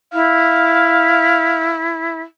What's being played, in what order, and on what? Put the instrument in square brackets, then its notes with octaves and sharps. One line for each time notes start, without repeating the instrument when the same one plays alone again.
[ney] E4 [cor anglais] F5